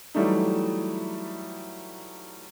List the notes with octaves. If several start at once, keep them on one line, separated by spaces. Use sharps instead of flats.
E3 F#3 G3 A3 D#4